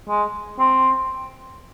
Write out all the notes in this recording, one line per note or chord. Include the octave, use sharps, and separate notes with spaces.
G#3
C4